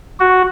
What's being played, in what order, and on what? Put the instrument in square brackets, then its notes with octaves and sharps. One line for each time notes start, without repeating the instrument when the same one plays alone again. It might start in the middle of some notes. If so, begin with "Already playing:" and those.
[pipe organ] F#4